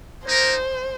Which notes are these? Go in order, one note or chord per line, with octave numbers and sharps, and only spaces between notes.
A#3 D#4 A#4 C5